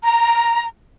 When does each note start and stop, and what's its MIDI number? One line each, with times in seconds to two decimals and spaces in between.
0.04 0.66 82